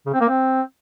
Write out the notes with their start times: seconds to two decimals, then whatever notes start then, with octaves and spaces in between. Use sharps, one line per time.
0.06 C#3
0.13 C4
0.21 A#3
0.28 C4